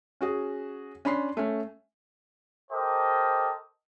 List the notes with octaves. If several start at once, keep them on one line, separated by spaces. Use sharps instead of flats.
C#4 F#4 G#4
C#4 D4 B5 C6 C7
A3 C#4
G4 A4 A#4 C5 D#5